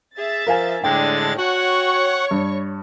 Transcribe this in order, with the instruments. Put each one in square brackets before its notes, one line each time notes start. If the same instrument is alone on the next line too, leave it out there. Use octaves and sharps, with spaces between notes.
[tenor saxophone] G#4 [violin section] E5 A6
[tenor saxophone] F3 [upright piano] A#4 F5 G#5
[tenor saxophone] A2 [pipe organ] D3 G#3 A6 [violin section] D4 [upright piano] G5
[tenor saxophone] F#4 [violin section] C#5 C#6 [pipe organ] F#5
[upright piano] G2